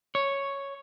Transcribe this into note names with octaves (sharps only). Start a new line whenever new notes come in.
C#5